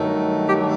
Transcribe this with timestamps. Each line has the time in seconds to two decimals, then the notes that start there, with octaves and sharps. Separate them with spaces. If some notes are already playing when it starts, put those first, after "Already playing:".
Already playing: G2 D#3 F#3 A3
0.49 G4